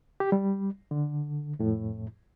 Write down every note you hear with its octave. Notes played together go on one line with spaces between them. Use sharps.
G4
G3
D3
F2 A2